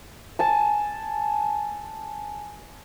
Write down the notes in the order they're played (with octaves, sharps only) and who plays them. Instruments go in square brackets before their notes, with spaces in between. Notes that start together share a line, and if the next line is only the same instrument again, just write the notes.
[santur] G#5 A5